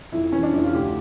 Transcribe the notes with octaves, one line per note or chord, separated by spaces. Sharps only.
F2 E4
E3 C#4
D4
F2 E4
F4
D2 G4